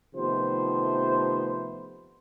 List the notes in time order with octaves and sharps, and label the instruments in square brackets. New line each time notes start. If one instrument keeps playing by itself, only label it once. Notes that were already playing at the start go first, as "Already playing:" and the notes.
[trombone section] C3 D#3 F3 A3 B3 C5